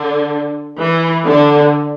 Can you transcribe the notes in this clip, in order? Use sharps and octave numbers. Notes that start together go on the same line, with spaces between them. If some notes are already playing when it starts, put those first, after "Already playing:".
Already playing: D3
E3
D3